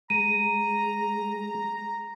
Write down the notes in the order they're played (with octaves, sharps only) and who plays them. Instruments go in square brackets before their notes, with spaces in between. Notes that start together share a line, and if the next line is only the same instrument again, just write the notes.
[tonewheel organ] G#3 [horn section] A#5 [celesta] D#7